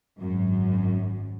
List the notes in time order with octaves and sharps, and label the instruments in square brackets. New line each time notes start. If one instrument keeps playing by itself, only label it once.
[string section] G#1 F#2